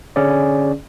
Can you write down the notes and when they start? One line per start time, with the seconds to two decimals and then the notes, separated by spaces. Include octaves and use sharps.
0.16 D3 C#4 G#4 D5